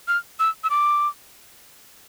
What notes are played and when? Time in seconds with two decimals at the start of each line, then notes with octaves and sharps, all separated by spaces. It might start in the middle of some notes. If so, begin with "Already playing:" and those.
0.08 F6
0.40 E6
0.64 E6
0.70 D6